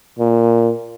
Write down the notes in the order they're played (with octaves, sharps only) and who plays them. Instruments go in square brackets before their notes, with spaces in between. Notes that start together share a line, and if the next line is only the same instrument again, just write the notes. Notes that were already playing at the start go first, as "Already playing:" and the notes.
[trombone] A#2